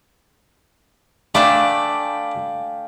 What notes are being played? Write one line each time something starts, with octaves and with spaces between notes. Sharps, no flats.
A3 D4 F5 G5 G#5 B5 D6